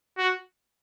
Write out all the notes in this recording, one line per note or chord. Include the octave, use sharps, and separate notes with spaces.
F#4